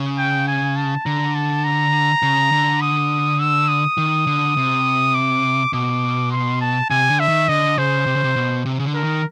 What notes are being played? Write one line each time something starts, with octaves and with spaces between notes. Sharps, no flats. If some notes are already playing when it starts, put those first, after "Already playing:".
Already playing: C#3
G5
G#5
A5
D3 A#5
A5
A#5
C#3
D3
D#6
E6
D#6
D#3
D3
C3
D6
B2 D6
C6
A5
C3 G#5
D3
E5
D#3
D3 D#5
C#3 C5
C3
C#3
C3
B2
C3
C#3
D3
A#4
D#3